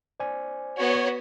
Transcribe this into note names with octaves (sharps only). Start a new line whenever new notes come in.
C5 D5 G#5
B3 F#4 C#5